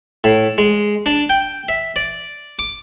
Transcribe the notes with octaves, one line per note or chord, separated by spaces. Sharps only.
A2
G#3
D4
G5
E5
D5
D6